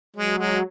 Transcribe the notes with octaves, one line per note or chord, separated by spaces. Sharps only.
F#3 G#3
G#3